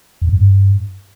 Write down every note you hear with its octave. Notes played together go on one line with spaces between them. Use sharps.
F2
F#2
G2